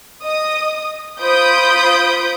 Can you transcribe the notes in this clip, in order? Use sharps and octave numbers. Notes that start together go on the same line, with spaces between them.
D#5 D#6
F4 C5 B5 D#6 G6 D7